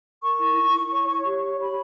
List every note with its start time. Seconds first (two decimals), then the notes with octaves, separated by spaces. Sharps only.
0.22 A#4 C#6
0.40 E4
0.56 E4
0.73 E4
0.91 C#5
1.08 C#5
1.25 G4
1.43 C#5
1.60 C#5 B5